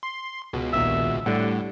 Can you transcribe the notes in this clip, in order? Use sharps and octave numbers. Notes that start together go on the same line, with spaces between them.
C6
C#2 B2
A#1 D#2 A#2 E5
A2 D3 G3 F#5